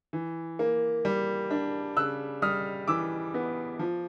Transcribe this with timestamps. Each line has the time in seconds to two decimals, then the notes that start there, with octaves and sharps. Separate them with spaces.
0.13 E3
0.59 A#3
1.05 G3
1.51 D4
1.97 C#3 E6 F#6
2.42 G3 D#6 F6
2.88 E3 D6 E6
3.34 B3
3.79 F3